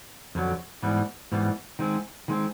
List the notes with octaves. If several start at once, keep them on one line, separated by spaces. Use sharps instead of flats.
F2 D3 F#3
G#2 E3 G3 B3
G#2 E3 G3 B3
D#3 G#3 C4
D#3 G#3 C4